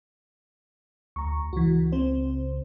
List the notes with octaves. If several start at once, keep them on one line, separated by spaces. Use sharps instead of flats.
D2 A#5 C#6
C#2 E3 F#4
C4 C5